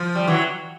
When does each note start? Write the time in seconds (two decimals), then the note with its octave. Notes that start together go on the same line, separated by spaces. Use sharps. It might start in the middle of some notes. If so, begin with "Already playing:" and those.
Already playing: F3
0.15 G3
0.27 E3 F#3